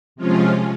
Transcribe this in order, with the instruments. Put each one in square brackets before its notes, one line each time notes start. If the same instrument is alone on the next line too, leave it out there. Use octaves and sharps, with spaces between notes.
[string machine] C3 F3 G#3 C#4 F4